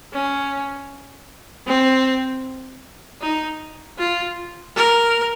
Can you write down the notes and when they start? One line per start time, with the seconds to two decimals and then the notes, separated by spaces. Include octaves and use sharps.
0.13 C#4
1.66 C4
3.22 D#4
3.98 F4
4.76 A#4